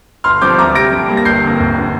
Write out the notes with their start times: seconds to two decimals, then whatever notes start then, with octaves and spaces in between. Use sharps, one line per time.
0.24 G1 C6 F6
0.41 G2 F3 C4 D6 G6
0.58 D2 A#5 D6
0.75 C3 G3 A#6 D7
0.92 G2
1.09 G3 A#3
1.17 A#6
1.25 G1 G6 C7
1.42 F2 D3 A#3
1.60 F1
1.78 D3